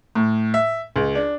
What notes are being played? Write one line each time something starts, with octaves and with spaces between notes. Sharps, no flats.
A2
E5
C#2
D4